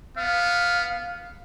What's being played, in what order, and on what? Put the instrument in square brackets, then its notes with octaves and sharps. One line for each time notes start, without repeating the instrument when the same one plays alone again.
[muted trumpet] B3 [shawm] F5